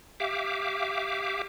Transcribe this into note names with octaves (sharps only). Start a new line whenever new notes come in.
G4 E5 F5 D6